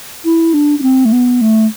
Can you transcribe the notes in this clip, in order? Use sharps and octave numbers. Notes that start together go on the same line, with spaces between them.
E4
D4
D4
C4
A3
B3
A3